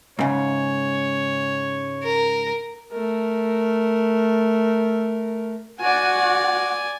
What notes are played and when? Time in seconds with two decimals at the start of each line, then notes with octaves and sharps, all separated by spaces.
0.19 G#2 C#3 C#5
2.03 A#4
2.91 A3 A#4
5.81 F#4 D5 F#5 G#5